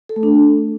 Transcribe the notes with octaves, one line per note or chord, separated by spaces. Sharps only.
A4
A3
D4